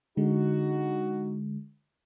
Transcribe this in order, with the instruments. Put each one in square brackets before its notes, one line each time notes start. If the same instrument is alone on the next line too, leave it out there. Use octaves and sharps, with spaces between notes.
[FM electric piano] D3 G#3 [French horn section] D#4 F#4